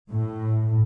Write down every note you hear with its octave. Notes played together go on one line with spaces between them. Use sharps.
A2